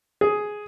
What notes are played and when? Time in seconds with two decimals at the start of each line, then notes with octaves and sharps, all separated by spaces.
0.21 G#4